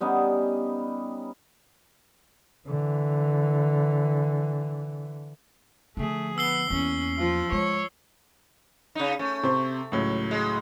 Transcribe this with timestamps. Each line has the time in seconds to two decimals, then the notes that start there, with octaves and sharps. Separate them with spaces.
0.01 G3 B3 C#4 D#4
2.67 D3 E3
5.97 D3 F3 A3 G#4
6.38 B3 E6 C7 G7
6.70 E2 A#3 C#4
7.17 F3 F4
7.52 G#3 C#5
8.95 C#3 D#4
9.19 A3 C#4
9.43 C3 C5
9.92 C#2 A2 F#3
10.31 G#3